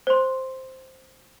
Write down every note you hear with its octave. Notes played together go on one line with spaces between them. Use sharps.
C5 C6